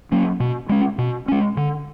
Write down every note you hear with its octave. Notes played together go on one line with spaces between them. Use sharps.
F#3 A#3 C#4
B2
G#3 C#4
B2
G#3 C#4
D3